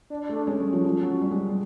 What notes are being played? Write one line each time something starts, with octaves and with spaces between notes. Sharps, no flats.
D4
D4
A3
D4
G#3 C#4
G3
F3
F3
F#3
G3
G#3
G3